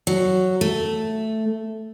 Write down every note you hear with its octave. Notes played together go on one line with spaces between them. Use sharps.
F#3
A3